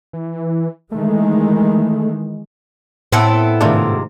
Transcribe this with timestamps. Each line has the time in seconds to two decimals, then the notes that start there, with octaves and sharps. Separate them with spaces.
0.13 E3
0.92 D#3 E3 G#3 A3
3.12 A2 B3 C4 E4 A4
3.61 G#2 C3 D#3 A3 D4 F4